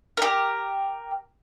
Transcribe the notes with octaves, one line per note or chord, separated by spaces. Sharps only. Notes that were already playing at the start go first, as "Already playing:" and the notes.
G4 A#4